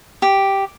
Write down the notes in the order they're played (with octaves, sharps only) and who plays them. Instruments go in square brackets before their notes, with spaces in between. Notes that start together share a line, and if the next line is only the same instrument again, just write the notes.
[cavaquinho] G4